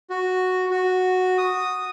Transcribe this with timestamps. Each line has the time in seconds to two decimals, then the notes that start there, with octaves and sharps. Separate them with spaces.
0.10 F#4
0.71 F#4
1.38 D#6